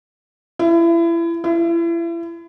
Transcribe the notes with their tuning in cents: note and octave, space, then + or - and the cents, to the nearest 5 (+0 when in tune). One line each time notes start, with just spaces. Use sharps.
E4 +30
E4 +35